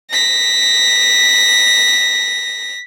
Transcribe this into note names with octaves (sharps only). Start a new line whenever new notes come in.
A#6 B6